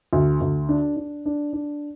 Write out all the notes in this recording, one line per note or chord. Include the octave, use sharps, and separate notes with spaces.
D2
D2
D4
D4
D4
D4